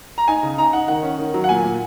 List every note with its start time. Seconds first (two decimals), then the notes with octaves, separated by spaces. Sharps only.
0.18 A#5
0.28 D#4 G#5
0.43 C#3
0.58 D#4 A#5
0.73 D#4 F#5
0.88 D#3 F#5
1.03 C#4
1.19 D#3
1.34 F#3
1.44 F#5
1.49 A#2 G#5
1.64 A#2